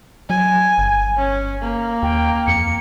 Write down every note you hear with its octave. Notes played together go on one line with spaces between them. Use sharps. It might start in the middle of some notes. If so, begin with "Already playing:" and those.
F#3 G#5
G1
C#4
A#3
D#2 G5
F2 C#7